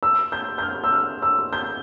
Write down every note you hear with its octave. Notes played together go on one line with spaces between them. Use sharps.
E6
G6
G6
F6
E6
F6
E6
G6